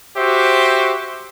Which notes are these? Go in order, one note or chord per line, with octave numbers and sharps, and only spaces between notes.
F#4 G4 C5 E5